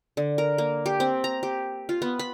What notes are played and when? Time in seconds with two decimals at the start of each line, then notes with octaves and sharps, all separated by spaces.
0.17 D3
0.38 A#4
0.58 A#3
0.86 G4
1.00 C4
1.24 A#5
1.43 G4
1.89 F4
2.02 B3
2.19 B5